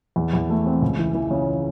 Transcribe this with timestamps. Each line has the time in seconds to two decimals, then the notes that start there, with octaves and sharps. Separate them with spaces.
0.16 E2
0.33 E2
0.50 A3
0.66 C4
0.82 C#2
0.99 E3
1.14 E3
1.31 C#3